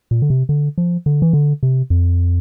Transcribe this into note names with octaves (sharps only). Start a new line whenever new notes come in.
A#2
D3
C3
D3
F3
D3
E3
D3
C3
F2